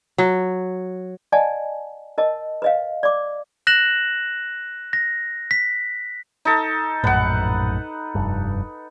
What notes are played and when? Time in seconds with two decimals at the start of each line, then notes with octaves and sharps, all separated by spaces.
0.18 F#3
1.32 D5 D#5 F#5 G#5 A5
2.18 A#4 D#5 A5
2.62 B4 D#5 F5
3.03 D5 D6
3.67 F#6 A#6 E7 F#7
4.93 A#6
5.51 B6
6.45 D#4 A4
7.04 A#1 F#2 A2 B4 F#5
8.15 F1 G2